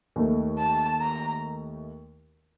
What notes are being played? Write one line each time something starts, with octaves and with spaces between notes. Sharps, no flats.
D#2 D#3 A3
A5
A#5